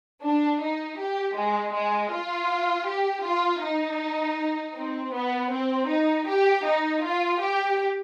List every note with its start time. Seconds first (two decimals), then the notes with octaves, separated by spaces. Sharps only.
0.22 D4
0.60 D#4
0.98 G4
1.36 G#3
1.74 G#3
2.12 F4
2.87 G4
3.24 F4
3.62 D#4
4.76 C4
5.13 B3
5.51 C4
5.88 D#4
6.27 G4
6.65 D#4
7.02 F4
7.40 G4